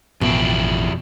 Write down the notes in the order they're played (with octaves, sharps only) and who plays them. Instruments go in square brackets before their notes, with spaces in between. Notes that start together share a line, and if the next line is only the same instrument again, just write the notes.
[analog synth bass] A1 [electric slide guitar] F2 E4 G5 [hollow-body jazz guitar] B2